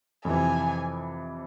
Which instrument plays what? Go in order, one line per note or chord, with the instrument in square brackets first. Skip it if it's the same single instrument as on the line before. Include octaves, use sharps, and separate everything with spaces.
[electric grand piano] F2 C3 E3 [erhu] G#5